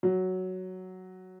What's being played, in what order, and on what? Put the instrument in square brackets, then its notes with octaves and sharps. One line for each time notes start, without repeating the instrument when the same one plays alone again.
[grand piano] F#3